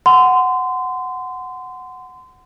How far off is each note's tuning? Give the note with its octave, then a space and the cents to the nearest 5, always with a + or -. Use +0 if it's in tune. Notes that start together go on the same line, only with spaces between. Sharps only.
F#5 +0 C6 -25